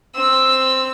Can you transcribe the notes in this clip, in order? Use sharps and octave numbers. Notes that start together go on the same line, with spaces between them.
C4 E6